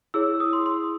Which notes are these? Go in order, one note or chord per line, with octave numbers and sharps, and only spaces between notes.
E4 G#4 C#5 E6
D#6
C6
C6